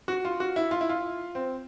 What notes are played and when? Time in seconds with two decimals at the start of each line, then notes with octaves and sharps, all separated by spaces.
0.08 F#4
0.25 F4
0.40 F#4
0.56 E4
0.71 F4
0.81 E4
0.89 F4
1.35 C4